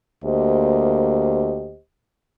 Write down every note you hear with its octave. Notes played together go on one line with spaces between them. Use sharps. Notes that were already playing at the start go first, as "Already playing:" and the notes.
D2 A#3 G4 C5 D#5